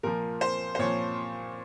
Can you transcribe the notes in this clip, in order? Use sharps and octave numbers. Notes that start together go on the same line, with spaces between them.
A#2 F3 A#4
C5
C5
A#2 F3 C#5